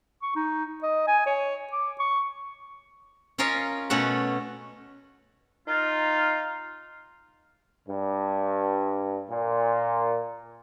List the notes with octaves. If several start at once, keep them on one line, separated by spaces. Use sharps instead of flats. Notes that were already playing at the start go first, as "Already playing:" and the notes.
C#6
D#4
D#5
G#5
C#5
D6
C#6
C#4 F4 A#4 C#5 D#5 F5
B2 A3 C#4 A4 F#5
D#4 F4
G2
A#2